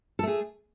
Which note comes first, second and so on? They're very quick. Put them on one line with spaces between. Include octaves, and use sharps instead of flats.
A4 A3 G#4